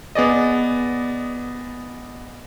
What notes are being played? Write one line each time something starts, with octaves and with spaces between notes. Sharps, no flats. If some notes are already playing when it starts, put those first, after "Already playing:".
B3 G#4 D5 D#5